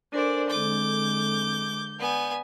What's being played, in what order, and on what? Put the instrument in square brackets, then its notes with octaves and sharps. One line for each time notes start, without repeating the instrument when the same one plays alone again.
[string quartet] D4 C5 D5 [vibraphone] A4 A#4 G#5
[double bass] D3 G#3 [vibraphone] C4 A4 [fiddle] D6 [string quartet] G6
[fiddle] B3 G#5 [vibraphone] D5